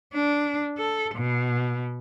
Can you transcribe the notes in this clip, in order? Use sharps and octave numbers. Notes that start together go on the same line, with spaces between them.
D4
A4
B2